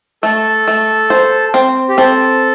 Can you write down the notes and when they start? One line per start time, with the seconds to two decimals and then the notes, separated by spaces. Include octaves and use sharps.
0.23 A3 A4
0.68 A3
1.10 C5
1.54 C4
1.89 G4
1.97 C4 A4